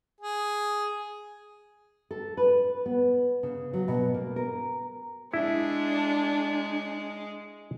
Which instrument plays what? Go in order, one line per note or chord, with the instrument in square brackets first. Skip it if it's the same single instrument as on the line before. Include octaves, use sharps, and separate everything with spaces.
[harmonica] G#4
[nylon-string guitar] A4
B4
B3
C#3
F#3
B2
A#3
A#4
[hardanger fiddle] G#3 [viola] D4 [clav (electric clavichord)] E4